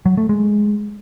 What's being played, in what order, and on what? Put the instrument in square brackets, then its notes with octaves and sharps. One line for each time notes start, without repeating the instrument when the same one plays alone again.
[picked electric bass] F#3
A3
G#3